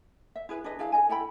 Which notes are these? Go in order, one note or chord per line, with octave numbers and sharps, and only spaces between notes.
E5
E4 G#4 B4
D4 G#4 B4 D#5
D4 E4 G#4 F5
A4 D#5 G#5
E4 A4 G5 B5